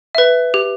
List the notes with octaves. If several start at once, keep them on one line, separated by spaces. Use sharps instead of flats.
B4 E5
G4